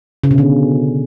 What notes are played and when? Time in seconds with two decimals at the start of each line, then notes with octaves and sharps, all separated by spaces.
0.24 C#3
0.31 B2
0.38 D3